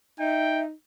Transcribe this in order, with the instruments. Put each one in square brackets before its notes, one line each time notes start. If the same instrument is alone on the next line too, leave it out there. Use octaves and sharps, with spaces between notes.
[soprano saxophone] D#4 [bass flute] E5 [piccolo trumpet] G5